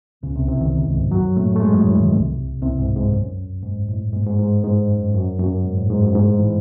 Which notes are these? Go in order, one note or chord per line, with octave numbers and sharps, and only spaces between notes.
C#2 C#3
C2 C3
C2 C3
D#2 D#3
G#2
F#2 F#3
A2 A3
A3
G#2 G#3
F#2 F#3
E2 E3
D#2 D#3
C2 C3
C2 C3
G#2
G#2
F#2
G#2
A2
G#2
G#2
G#2
G#2
F#2
F#2
F#2
G#2
A2
G#2
F#2
G#2
A2
E3